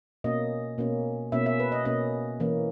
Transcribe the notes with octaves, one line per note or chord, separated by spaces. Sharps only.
B2 A#3 C#4 D#5
B2 A#3 C#4
B2 A#3 C#4 E5
E5
B4
D#5
B2 A#3 C#4 D#5
E3 A#3 C#4